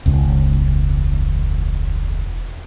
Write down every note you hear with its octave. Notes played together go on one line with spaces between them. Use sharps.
E1 C#2